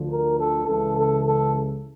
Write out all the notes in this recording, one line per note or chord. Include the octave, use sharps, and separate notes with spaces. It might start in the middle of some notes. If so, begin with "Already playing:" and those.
Already playing: D2 D3 F3
A#4
A4
C#2 C#3 E3 A4
A4
A4